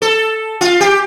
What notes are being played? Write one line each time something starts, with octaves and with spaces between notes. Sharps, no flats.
A4
F4
G4